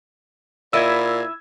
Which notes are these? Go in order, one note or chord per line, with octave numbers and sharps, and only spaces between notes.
A#2 E4 D#5 E6 G#6